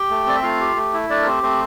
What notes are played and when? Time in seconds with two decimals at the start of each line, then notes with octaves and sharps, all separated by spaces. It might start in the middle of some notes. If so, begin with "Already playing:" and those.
Already playing: G4 G5
0.10 A3
0.27 C4 D5
0.36 E5
0.43 A3 F4 F5
0.61 G4
0.76 A3
0.93 E4
1.10 A3 D4 D5
1.22 A#4
1.27 C4 G4 C5
1.43 A3 C4 C5